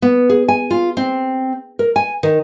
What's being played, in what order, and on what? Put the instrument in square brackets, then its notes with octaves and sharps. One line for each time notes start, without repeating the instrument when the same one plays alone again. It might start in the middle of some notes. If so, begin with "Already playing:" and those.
[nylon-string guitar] B3
G#4
G#5
F4
C4
A#4
G#5
D#3